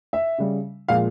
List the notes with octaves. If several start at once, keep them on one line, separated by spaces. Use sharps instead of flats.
E5
C#3 G3
A#2 F3 G#3 F5